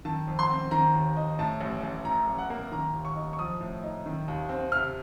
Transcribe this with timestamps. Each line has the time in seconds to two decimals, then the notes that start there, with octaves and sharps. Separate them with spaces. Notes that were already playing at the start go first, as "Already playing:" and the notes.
0.05 D#3 A5
0.28 F2
0.39 C6
0.50 C4
0.71 D#3 A#5
0.94 D#2
1.16 D#4
1.39 A2 A5
1.61 A1
1.83 A1
2.05 A2 A#5
2.28 A1
2.38 F#5
2.50 A#3
2.72 D#3 A#5
2.93 D#2
3.05 C#6
3.16 D#4
3.33 C#6
3.39 F3 D#6
3.60 A2
3.83 D#4
4.06 D#3
4.28 D#2
4.49 C4
4.72 C3 F6